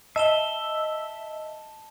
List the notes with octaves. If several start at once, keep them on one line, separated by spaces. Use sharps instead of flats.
D#5 E5 A5 E7 G7